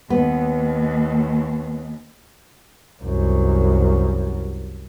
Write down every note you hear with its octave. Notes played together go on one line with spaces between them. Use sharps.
D#2 B3
C2 F#2